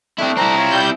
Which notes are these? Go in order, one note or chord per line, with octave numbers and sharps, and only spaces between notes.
A3 C4 D4 E4
C4 E4 A#5
F4 C#5
G3 G6